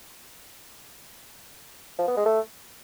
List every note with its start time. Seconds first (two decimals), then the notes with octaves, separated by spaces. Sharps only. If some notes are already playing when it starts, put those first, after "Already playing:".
1.99 F3
2.08 B3
2.17 G#3
2.26 A3